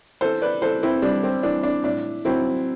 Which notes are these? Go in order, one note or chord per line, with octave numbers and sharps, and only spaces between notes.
E3 A4 C5
B4 D5
E3 A4 C5
C4 E4
G3 D4
C4
E3 D4
D4
A2 D4
F#3 C4 E4